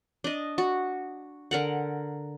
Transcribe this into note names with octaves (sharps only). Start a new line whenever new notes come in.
D4 D#5
F#4
D3 A#4 F#5